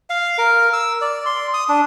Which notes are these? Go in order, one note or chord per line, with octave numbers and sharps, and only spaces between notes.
F5
A#4
E6
D5
C6
D#6
D4